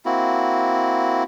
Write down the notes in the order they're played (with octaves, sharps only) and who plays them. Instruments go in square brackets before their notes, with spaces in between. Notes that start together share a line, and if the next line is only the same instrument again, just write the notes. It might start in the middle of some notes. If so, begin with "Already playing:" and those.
[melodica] A#3 C4 E4 F#4